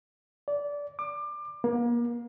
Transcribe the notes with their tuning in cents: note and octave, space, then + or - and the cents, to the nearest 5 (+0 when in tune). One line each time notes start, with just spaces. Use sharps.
D5 -20
D6 +25
A#3 +35